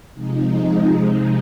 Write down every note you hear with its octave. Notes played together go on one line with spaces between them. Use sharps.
C3 F3 G#3 D#4